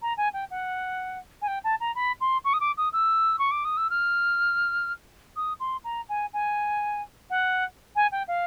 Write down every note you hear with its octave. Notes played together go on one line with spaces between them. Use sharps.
A#5
G#5
G5
F#5
G#5
G5
A5
A#5
B5
C6
C#6
D#6
D6
D#6
E6
C#6
D6
D#6
E6
F6
D#6
C6
A#5
G#5
G#5
F#5
G#5
G5
F5